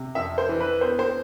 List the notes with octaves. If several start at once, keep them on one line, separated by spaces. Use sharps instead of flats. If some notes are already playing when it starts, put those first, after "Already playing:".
Already playing: C3
F2 E5
C5
E3
B4
B3 C5
C5